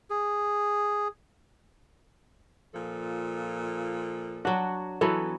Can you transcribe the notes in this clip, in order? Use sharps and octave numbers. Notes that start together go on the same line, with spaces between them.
G#4
A#2 F3 A4
F#3 D4 F#4
E3 F#3 B3 A4